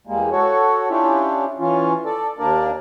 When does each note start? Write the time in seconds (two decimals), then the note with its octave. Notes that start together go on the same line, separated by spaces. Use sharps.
0.07 E2 G3 G#3 A#3
0.32 F#4 A4 C#5
0.90 C#4 D4 E4 F4 G4
1.59 E3 C#4 F4
2.05 A4 D5
2.39 D#2 A#3 D4 A#4 D5